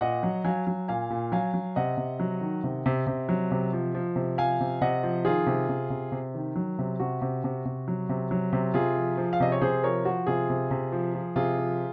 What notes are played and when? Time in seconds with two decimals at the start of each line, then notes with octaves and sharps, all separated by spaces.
0.01 A#2 D#5 F#5
0.23 F#3
0.45 F#3 F5 G#5
0.67 F#3
0.88 A#2 F5 G#5
1.10 A#2
1.32 F#3 F5 G#5
1.54 F#3
1.76 C3 D#5 F#5
1.97 C3
2.20 F#3
2.41 D#3
2.64 C3
2.86 C3
3.07 C3
3.29 F#3
3.51 C3
3.73 F3
3.95 F3
4.16 C3
4.38 F3 F5 G#5
4.60 C3
4.81 C3 D#5 F#5
5.03 F3
5.25 D#3 F4 G#4
5.47 C3
5.69 C3
5.90 C3
6.12 C3
6.35 D#3
6.56 F#3
6.79 C3
7.00 C3 F#4
7.22 C3
7.44 C3
7.65 C3
7.88 F#3
8.09 C3
8.31 F#3
8.53 C3
8.74 C3 F4 G#4
8.96 F3
9.17 F3
9.33 F5
9.40 C3 D#5
9.52 C#5
9.61 C3 G#4 C5
9.83 F3 A#4 C#5
10.05 F3 F#4
10.27 C3 F4 G#4
10.50 C3
10.71 C3
10.92 F3
11.15 F3
11.36 C3 F4 G#4
11.58 F3